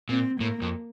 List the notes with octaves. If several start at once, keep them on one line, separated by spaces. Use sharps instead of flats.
A#2 C4
A2 A#3
F2